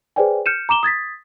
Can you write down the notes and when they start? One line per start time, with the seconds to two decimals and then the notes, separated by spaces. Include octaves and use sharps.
0.16 G#4 B4 C5 D5 G5 G#5
0.46 F6 G6 C#7 D#7 E7
0.69 A#5 D6 E7 G7
0.83 D#6 G#6 A6 B6